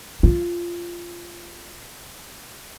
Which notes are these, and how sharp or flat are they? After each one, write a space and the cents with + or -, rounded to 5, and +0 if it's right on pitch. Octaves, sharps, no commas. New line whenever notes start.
F4 -10